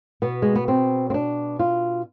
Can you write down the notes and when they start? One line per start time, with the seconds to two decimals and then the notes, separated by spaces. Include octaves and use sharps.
0.22 B2 B3
0.42 G#3
0.55 B3
0.68 C4
1.10 C4
1.14 D4
1.59 F4